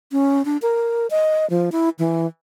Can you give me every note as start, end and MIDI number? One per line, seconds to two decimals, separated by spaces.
0.12 0.45 61
0.45 0.57 62
0.62 1.07 70
1.10 1.48 75
1.50 1.70 53
1.72 1.89 64
1.99 2.27 52